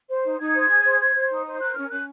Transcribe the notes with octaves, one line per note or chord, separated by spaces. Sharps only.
C5
D#4
D#4 G#6
C5
G#4
C5
C5
C5
D#4
C5
A#4 F#6
C#4 F6
C#4 F#6